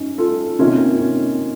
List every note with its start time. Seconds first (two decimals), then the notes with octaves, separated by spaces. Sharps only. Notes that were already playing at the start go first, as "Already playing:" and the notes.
Already playing: F#2 C#4 D#4
0.18 F4 A4
0.59 C3 D#3 A#3 C#4 F4
1.00 C#4